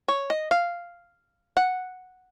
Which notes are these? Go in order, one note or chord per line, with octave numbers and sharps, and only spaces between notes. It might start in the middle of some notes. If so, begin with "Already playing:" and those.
C#5
D#5
F5
F#5